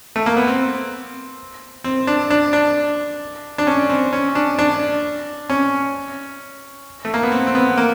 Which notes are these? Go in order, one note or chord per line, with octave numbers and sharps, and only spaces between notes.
A3
A#3
B3
C4
C4
D4
D4
D4
D4
C#4
C4
C#4
D4
D4
C#4
A3
A#3
B3
C4
C4
B3
A#3